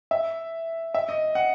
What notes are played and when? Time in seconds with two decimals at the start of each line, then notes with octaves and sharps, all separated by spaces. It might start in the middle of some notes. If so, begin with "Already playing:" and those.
0.11 E5
0.94 E5
1.09 D#5
1.35 F#5